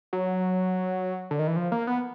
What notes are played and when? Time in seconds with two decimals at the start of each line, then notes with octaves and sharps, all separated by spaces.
0.13 F#3
1.31 D3
1.39 D#3
1.47 E3
1.56 F3
1.72 A#3
1.87 B3